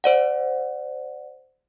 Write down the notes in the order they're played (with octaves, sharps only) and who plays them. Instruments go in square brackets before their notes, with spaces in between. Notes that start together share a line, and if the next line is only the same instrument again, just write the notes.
[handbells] C5 D5 F#5